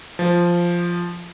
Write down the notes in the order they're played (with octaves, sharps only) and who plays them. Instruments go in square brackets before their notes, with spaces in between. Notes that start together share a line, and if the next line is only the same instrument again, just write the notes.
[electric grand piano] F3